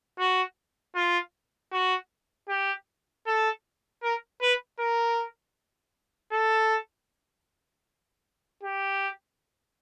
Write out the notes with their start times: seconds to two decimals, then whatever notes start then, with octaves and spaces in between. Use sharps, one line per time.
0.19 F#4
0.95 F4
1.72 F#4
2.49 G4
3.27 A4
4.03 A#4
4.42 B4
4.79 A#4
6.32 A4
8.63 G4